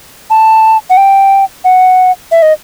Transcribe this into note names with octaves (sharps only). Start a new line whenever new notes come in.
A5
F#5
G5
F#5
E5
D#5